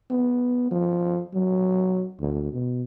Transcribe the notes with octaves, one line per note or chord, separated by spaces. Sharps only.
B3
F3
F#3
D2
B2